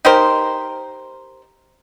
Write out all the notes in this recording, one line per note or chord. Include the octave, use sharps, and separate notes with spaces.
D#4 G4 A#4 C5